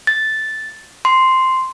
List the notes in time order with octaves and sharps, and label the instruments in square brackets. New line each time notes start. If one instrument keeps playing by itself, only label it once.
[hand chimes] A6
C6